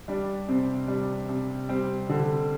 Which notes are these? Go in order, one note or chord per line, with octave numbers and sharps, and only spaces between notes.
G3 D4
C3 C4
G3 D4
C3
G3 C4
D3